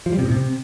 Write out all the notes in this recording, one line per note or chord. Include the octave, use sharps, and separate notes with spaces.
F3
G3
C3
A2
C3